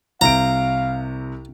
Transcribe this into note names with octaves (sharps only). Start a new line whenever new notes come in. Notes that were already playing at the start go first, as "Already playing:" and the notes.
C2 C3 F5 A#5 D7